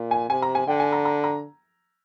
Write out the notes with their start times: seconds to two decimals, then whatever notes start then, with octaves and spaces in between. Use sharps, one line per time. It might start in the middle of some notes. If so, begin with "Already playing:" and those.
Already playing: A#2
0.11 G#5
0.29 C3 G#5
0.42 A#5
0.55 G#5
0.67 D3 G5
0.80 G#5
0.92 A#5
1.05 A#5
1.24 A#5